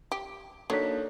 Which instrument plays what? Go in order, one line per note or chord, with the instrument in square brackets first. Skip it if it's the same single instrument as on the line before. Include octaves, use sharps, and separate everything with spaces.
[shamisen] G4
[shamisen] F#3 [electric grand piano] A#3 D4 D#4 [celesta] A4 C#5 B6